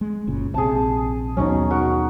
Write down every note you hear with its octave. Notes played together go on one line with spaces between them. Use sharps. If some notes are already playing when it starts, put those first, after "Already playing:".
G#3
F#1 A#2 C#3
A#1 C3 G#4 A5
D#2 B2 F#3 C#4 D#4
F#4 A#4